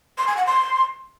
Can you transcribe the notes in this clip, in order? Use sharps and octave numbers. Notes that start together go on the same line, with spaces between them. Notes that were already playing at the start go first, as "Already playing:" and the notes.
C6
G#5
F#5
C6